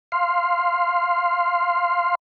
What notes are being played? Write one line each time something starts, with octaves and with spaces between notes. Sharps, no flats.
F5 C6